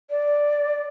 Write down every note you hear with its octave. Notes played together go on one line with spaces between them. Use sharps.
D5